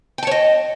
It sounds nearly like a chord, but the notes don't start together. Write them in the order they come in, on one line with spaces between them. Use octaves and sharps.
G5 A5 C#5 D#5